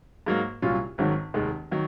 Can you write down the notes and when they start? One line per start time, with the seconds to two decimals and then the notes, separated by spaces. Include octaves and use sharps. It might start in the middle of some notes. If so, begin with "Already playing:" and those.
0.26 G#2 F#3 A#3
0.62 C2 A#2 F#3 C#4 F4
0.98 G#1 G#2 D#3 F#3 C#4
1.34 F1 D#2 D#3 G#3
1.71 D#3 F#3